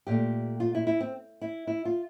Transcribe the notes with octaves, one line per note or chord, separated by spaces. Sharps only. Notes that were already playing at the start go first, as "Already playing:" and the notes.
A#2 A3 G4
F4
E4
E4
C4
E4
E4
F4